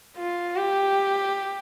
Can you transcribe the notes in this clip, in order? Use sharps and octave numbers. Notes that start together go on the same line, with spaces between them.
F4
G4